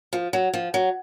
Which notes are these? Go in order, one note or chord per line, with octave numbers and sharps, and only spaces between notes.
F3
F#3
F3
F#3